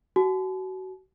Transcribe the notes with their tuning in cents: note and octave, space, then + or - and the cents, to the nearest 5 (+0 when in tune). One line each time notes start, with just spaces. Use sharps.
F#4 +25 A5 -45